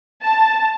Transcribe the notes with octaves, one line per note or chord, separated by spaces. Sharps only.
A5